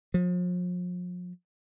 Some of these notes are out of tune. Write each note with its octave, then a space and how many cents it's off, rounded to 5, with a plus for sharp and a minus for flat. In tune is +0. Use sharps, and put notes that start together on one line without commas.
F3 +40